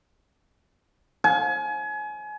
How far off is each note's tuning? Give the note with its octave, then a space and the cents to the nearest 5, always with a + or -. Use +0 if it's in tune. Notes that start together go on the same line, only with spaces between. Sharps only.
G#5 +30